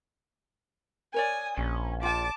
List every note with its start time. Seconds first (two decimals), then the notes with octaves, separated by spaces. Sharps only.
1.14 A#4 C#5 D5 G#5 D#6
1.58 A#1 C#4
2.03 F4 G5 A5 D6